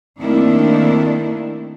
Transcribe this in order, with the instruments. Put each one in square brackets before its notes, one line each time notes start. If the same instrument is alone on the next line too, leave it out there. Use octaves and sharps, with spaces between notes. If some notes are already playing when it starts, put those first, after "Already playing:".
[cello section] D#3 A3 A#3 C4 D4 E4